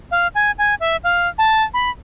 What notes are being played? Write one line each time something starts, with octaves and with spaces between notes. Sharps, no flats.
F5
G#5
G#5
E5
F5
A5
B5